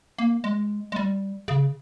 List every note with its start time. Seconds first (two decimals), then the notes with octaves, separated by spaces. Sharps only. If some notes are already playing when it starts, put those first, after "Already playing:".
0.18 A#3
0.44 G#3
0.92 G#3
0.96 G3
1.48 C#3